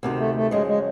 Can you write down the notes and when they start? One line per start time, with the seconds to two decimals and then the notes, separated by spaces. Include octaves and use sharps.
0.03 D2 C3 D#3
0.19 A3
0.35 A3
0.51 F#2 C#3 F3 G#3
0.67 G#3